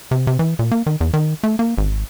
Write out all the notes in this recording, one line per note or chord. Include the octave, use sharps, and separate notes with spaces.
C3
C3
E3
A#2
A#3
D#3
E2
D#3
A3
A#3
G#1